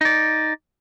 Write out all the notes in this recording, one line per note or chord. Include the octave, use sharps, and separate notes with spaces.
D#4 D5